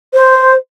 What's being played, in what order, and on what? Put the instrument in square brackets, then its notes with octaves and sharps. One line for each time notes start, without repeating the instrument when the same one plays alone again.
[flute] C5